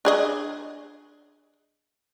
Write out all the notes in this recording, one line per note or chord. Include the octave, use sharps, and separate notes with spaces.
D4 G#4 D#5